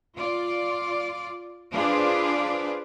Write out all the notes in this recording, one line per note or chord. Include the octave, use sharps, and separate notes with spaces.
F4 D5
D4 F4 G#4 B4 C5 D5